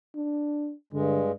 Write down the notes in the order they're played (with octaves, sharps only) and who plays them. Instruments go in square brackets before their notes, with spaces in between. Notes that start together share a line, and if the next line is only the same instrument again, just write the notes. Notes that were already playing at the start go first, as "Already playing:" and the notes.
[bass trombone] D4
[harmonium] G2 G#3 [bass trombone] D3